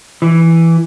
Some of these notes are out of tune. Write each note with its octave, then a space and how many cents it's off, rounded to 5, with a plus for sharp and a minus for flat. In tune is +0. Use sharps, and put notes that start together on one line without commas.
E3 +5